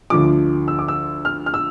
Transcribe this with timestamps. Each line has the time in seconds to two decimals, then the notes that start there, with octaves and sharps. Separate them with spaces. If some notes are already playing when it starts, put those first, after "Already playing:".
0.10 D2 D3 F3 D6
0.68 E6
0.79 D6
0.88 E6
1.25 F6
1.46 F6
1.54 E6